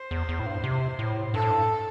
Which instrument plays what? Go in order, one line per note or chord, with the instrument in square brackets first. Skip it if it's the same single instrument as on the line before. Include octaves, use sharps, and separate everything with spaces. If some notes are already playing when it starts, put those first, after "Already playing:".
Already playing: [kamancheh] C5
[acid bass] E2
E2
A2
G2
C3
A2
[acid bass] G2 [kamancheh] A4
[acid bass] A2
G2